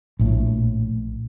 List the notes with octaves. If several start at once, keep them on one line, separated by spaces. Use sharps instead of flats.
A#1 A2